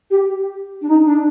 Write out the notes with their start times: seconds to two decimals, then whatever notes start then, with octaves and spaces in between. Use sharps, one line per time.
0.10 G4
0.82 D4
0.88 D#4
1.04 D4